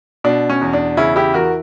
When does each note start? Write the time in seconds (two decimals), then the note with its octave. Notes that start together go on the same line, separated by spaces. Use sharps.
0.24 B2 D4
0.49 C#4
0.61 E2
0.73 D4
0.97 C#3 C#4 E4
1.16 E4 G4
1.34 E3 F#4 A#4